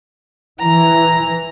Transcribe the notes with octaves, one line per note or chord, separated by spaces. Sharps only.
E3 A#5